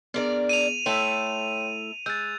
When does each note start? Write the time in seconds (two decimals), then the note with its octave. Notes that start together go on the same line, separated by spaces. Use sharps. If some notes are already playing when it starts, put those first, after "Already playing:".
0.14 B3 D4 G#4 A#4 D5
0.49 D#7 F7
0.86 A3 E4 A4 C#5 G5 C6
2.06 G#3 E6 F#6 G6 A6